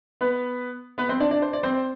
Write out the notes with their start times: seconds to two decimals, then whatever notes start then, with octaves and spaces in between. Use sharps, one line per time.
0.21 B3 B4
0.98 B3 B4
1.09 C4 C5
1.20 D4 D5
1.31 D4 D5
1.42 C5
1.53 D5
1.63 C4 C5